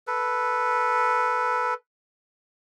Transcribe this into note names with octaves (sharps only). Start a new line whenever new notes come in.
A4 B4